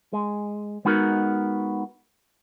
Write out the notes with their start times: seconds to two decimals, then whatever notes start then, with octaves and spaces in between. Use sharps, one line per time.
0.13 G#3
0.85 G#3 B3 D#4 F#4 A#4